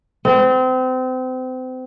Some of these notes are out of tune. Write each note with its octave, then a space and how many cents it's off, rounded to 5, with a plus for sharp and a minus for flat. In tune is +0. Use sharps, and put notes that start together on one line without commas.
C4 -30